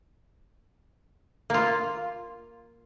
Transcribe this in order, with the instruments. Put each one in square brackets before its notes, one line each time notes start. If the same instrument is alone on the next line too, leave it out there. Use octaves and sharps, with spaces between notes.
[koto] A#3 F4